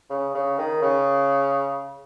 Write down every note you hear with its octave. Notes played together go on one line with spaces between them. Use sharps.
C#3
C#3
D#3
C#3